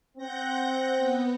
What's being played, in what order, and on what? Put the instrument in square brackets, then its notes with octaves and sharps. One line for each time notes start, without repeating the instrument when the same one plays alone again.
[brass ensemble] C4 [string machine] F#5 G6 A#6
[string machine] B3